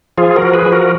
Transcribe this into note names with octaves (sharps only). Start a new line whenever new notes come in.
F3 F4 G#4
F#4 A#4
F3
G#4 B4
F3
F#4 A#4